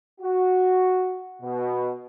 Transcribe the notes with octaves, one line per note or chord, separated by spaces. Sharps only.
F#4
B2